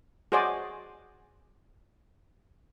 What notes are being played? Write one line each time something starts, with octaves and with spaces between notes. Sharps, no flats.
F#4 G#4 C5 D5 D#5 G#5